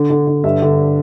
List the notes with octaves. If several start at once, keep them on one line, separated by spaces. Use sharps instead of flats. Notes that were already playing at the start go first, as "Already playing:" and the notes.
Already playing: D3
D3
D3
G2 E5
D3